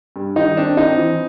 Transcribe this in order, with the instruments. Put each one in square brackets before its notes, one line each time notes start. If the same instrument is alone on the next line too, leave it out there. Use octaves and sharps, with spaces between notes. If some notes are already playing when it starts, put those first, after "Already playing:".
[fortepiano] G2
D#3 D#4
C4 D4
C4 D#4
E3